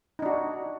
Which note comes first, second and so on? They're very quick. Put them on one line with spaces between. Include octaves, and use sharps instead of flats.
D#4 D4 F#4